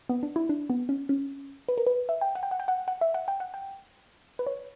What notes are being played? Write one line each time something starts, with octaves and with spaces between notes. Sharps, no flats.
B3
D4
E4
D4
B3
C#4
C#4
B4
A#4
B4
E5
G5
F#5
G5
F#5
G5
F#5
F#5
E5
F#5
G5
F#5
G5
B4
C#5